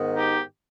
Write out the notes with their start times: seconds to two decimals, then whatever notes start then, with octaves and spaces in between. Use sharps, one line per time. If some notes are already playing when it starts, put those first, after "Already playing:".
Already playing: G#2 D#3 B3
0.14 D#4 G4